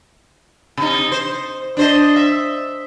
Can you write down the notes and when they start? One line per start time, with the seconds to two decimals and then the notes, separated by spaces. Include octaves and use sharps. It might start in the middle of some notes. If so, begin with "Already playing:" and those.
0.77 C3 D#4
1.12 C5
1.77 D4 C5 D#5
2.16 E5